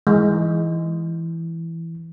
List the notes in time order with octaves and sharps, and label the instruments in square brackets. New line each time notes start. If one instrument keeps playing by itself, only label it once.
[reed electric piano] E3 [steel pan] G#3